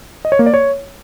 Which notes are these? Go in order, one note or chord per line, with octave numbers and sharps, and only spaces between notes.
D#5
C#5
A#3
D5
C#5